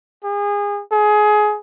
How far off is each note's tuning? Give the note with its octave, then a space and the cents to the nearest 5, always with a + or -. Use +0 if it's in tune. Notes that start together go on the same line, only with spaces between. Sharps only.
G#4 -30
G#4 +20